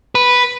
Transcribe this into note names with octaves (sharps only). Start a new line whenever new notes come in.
B4